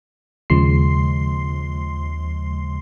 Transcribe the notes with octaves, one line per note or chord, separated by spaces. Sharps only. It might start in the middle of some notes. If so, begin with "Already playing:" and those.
D#2 C#3 F3 G#3 C6 C7